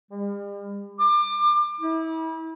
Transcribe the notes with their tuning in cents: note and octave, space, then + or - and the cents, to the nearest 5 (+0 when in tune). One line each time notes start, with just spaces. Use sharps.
G3 +45
D6 +30
E4 -35